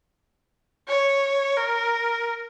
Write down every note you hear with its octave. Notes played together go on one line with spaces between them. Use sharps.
C#5
A#4